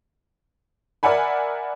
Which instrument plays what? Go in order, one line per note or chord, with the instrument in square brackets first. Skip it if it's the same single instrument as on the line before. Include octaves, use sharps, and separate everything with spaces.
[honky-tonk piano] A#4 D5 E5 F#5 G#5 B5